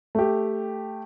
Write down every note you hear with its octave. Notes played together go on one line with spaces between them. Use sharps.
A3 G4